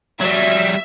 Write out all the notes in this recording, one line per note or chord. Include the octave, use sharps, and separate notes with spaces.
F#3 G3 E5